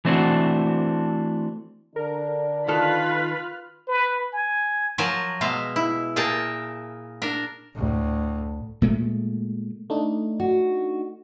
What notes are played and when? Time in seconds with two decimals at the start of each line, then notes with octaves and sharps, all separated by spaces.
0.05 E3 A3 C4 D4 F#4
1.96 D3 D4 A#4
2.68 D#3 F4 A4 B4 B5 F6 F#6
3.88 B4
4.33 G#5
4.98 F3 F#3 A#4 G#5 A5
5.41 B2 G#3 E5 F5
5.76 E4
6.16 A#2 G#4 A#4 G5 A5
7.22 D4 A#4
7.74 D2 A2
8.82 A#2 G#3 A3
9.90 A3 D4 D#4
10.40 F#4